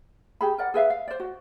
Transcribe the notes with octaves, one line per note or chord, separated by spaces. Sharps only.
G4 G#4 B5
A#4 D5 F#5
G#4 B4 E5 F5
F5
C5 D5
F#4